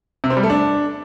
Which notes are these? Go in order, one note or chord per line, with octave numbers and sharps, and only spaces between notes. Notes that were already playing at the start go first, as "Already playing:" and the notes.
C3
C4
G3
A3
D4